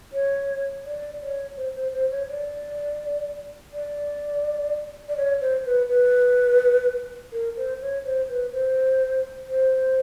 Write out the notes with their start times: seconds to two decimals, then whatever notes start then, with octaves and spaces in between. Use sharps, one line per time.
0.13 C#5
0.85 D5
1.21 C#5
1.57 C5
1.75 C5
1.94 C5
2.11 C#5
2.30 D5
3.73 D5
5.09 D5
5.17 C#5
5.41 C5
5.66 B4
5.89 B4
7.33 A#4
7.57 C5
7.82 C#5
8.05 C5
8.29 B4
8.53 C5
9.49 C5